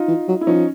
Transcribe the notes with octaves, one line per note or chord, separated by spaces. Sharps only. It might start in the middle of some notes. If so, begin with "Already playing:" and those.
Already playing: D#4 F4
E3
F#3
E4
F3 C#4 D#4